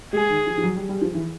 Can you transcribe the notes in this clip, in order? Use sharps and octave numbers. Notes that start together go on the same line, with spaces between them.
G#3 G#4
D#3
F3
F3
F#3
G3
G3
F3
E3